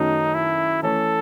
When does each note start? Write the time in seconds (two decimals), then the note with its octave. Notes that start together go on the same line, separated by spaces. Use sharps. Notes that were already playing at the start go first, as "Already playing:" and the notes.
Already playing: F#2 D#3 F#3 A3 D#4
0.34 E4
0.83 E3 A3 C#4 A4